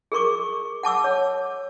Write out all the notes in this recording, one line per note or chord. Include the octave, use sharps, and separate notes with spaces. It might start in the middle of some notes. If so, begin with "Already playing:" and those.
G#4 A#4 C#6 D6
F#5 A5 D6 E6
C#5